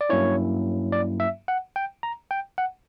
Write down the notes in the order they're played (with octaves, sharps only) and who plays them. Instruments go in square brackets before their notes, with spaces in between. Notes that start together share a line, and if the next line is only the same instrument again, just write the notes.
[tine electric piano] D5
G2 F#3 A#3 C#4 E4 C#5
D5
E5
F#5
G5
A#5
G5
F#5